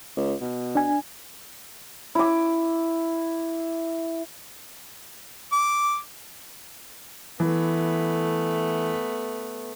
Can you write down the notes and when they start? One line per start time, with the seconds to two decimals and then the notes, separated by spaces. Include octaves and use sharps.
0.16 C#2
0.41 B2
0.75 D4 G#5
2.15 E4 D6
5.52 D6
7.40 E3 A3 B3